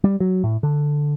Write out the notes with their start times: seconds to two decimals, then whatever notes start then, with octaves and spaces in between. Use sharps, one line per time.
0.04 G3
0.20 F#3
0.44 A2
0.63 D3